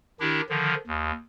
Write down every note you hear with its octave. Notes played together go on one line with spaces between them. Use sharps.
D#3 D4 E4 G4
D3 D#3 F3
D#2